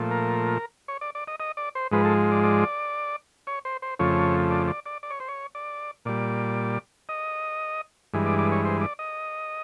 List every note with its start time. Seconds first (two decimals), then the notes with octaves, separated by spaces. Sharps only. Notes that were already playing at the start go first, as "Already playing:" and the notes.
Already playing: A#2 F3 A3
0.11 A#4
0.88 C#5
1.01 D5
1.15 D5
1.27 D#5
1.40 D#5
1.57 D5
1.75 C5
1.91 G#2 F3 G#3 B4
2.05 A4
2.31 D5
2.44 D5
3.47 C#5
3.65 C5
3.82 C5
3.99 F2 C#3 F3 A3 C#5
4.50 D5
4.68 D5
4.86 D5
5.03 D5
5.10 C#5
5.20 C5
5.28 C#5
5.55 D5
6.05 A#2 G3 D5
7.09 D#5
8.14 G2 E3 G#3
8.26 D5
8.39 D5
8.52 C#5
8.65 C5
8.81 D5
8.99 D#5